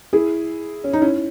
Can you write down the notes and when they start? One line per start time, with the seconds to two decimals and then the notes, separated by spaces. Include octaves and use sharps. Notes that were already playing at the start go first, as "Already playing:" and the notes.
0.13 E4 G#4
0.84 C#4
0.93 D#4
1.02 C#4 E4